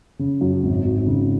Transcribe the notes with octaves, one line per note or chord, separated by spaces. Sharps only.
C#3
F#2
G#1
G#1
C#3